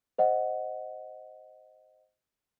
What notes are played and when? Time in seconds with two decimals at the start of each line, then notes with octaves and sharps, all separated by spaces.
0.18 C5 D#5 F#5